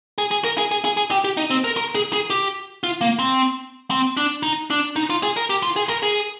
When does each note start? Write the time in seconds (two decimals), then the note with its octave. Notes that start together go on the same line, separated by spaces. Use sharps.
0.18 G#4
0.31 G#4
0.44 A#4
0.58 G#4
0.71 G#4
0.85 G#4
0.97 G#4
1.11 G4
1.24 G4
1.37 D#4
1.50 C4
1.64 A#4
1.77 A#4
1.95 G#4
2.13 G#4
2.30 G4
2.84 F4
3.01 A#3
3.19 C4
3.91 C4
4.17 D4
4.43 D#4
4.70 D4
4.96 D#4
5.10 F4
5.23 G#4
5.37 A#4
5.50 G4
5.63 F4
5.76 G#4
5.89 A#4
6.03 G#4